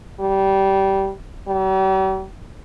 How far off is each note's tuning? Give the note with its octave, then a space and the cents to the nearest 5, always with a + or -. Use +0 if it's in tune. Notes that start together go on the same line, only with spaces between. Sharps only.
G3 -15
G3 -45